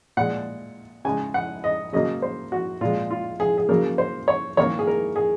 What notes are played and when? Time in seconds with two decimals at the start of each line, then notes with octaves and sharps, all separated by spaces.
0.17 A#2 G#3 F#5
1.05 C#3 G#3 G#5
1.34 F#5
1.64 D#5
1.93 C#3 F#3 A#3 D#5
2.22 C5
2.52 F#4
2.81 A#2 G#3 F4
3.11 F4
3.40 G#4
3.58 G#4
3.69 C#3 F#3 A#3 A#4
3.98 C5
4.28 C#5
4.57 D#3 A#3 C#5
4.79 G#4
4.87 A#4
5.16 G#4